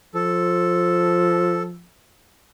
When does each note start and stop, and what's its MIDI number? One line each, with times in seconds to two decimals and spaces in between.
0.15 1.87 53
0.15 1.63 69